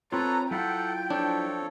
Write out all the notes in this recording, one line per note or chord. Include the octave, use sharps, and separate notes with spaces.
C4 F4 A4 B4 C#5 A#5
F#3 E4 F4 A4 F#5 G5
F3 D4 A4 C#5